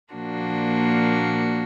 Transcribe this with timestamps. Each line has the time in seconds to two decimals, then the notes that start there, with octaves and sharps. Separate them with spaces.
0.13 A#2 F3 A#3 D4 F#4